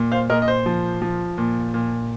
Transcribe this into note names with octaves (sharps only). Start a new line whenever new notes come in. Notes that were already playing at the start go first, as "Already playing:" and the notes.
Already playing: A#2
C5 F5
A#2 A#4 D#5
D#5
C5
F3
F3
A#2
A#2